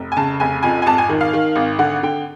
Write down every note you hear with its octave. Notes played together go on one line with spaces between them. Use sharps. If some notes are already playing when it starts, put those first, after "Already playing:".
Already playing: F1
G#5
C#3 A5
F1 G#5
F2 G#5
G#5
G#1 A5
G#5
D#3
F5
D#3
G#1
D3 F#5
D3 G5